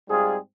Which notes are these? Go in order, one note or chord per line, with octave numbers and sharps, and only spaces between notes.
G#2 G3 C4 F4 G#4